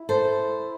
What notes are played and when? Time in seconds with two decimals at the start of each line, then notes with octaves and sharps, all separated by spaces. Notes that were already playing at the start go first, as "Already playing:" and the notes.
Already playing: E4
0.09 A4 C5